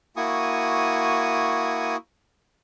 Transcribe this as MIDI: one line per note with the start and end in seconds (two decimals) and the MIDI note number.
0.17 1.96 58
0.17 1.96 64
0.17 1.96 66
0.17 1.96 80
0.17 1.96 85
0.17 1.96 87